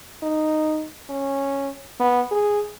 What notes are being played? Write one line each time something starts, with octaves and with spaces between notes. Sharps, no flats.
D#4
C#4
B3
G#4